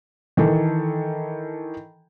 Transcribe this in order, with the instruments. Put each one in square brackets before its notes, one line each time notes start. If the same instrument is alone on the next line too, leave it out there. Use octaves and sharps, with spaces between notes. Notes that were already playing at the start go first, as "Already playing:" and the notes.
[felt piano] D#3 E3 A4